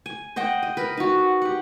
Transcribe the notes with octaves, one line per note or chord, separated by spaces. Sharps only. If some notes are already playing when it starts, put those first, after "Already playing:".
G#5
C5 D#5 F#5 G5
D#5
A#4 B4
D#4 F#4
G4 F#5